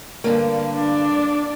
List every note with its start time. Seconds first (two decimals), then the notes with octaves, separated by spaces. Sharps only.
0.24 G2 D3 A#3
0.76 D4 D5